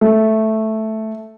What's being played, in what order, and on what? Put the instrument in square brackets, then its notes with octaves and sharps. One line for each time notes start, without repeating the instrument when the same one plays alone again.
[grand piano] A3